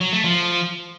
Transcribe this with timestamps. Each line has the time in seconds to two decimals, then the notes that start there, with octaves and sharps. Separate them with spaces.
0.01 F#3
0.13 A3
0.24 F3